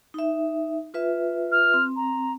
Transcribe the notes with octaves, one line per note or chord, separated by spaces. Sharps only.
D#4 E5
F4 B4 E5
F6
C4
A#5